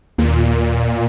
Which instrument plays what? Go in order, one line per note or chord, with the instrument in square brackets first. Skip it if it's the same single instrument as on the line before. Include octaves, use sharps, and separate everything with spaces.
[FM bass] D#2 [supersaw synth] A#2